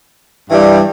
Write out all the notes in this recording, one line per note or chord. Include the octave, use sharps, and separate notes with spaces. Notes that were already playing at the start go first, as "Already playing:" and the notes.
G2 E3 G3